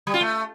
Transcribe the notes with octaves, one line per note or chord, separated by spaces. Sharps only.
G3
F4
A3